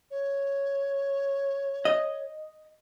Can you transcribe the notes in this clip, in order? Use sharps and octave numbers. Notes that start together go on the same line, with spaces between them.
C#5
D#5